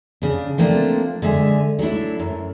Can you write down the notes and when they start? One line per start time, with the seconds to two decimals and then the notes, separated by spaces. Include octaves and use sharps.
0.22 C#3 D4
0.58 F3 A3 A#3 C4 D4
1.22 D3 G#3 E5 G#5
1.79 F#3 A3 D4 E4
2.19 F#2